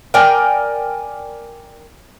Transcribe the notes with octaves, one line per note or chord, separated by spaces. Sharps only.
A#4 D5 G5 G#5